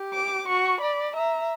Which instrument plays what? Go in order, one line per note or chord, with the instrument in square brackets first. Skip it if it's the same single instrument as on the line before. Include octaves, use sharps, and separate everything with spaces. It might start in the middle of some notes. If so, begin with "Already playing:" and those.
Already playing: [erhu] G4
[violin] D6
[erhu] F#4 [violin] C#6
[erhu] D5 [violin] B5
[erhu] E5 [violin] A#5